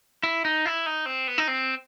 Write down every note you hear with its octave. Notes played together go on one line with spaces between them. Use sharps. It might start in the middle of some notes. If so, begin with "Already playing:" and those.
E4
D#4
E4
D#4
C4
B3
D#4
C4